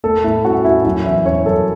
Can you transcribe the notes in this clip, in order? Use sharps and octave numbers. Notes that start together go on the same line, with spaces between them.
A3 A4
A2 E4
C#4 F#4
C#4 E4
F#2 E4
E3 E5
C#4 C#5
F#2 A4